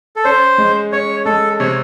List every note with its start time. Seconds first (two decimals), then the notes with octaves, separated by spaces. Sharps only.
0.16 A4
0.24 C#4 C5
0.58 G#3
0.92 C#4 C#5
1.25 G#3 A4
1.59 C3 C#5